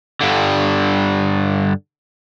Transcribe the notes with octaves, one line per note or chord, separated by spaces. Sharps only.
G2 D3